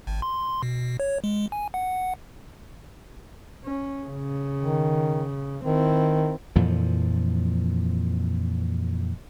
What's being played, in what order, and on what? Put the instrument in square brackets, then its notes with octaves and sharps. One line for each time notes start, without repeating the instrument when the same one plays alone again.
[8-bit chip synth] G#1
C6
B2
C#5
G#3
G#5
F#5
[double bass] C#4
C#3
[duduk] D#3
[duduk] D#3 [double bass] C4 E4
[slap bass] F2 A#2 E3 F3